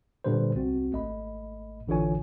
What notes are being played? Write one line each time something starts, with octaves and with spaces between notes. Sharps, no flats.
A#2 D3 G3 B4 C5
C2 C4 F#4
G#1 A3 D#5 B5
A1 D3 E3 F4 C#5 G#5